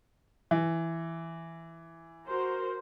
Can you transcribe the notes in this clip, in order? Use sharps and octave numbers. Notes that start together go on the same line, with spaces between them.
E3
F#4 A#4 C5